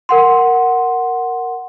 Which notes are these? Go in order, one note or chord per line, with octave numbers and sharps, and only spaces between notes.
A#4 F#5 C6